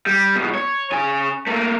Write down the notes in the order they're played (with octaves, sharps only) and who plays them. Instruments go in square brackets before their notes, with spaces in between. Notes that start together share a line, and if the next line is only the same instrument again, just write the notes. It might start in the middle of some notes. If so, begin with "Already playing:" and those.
[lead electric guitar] G3
G#2 B2
C#5
C#3 G#5
A3 A#3